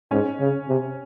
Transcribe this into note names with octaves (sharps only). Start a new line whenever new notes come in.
G#2 C#4
C#3
C3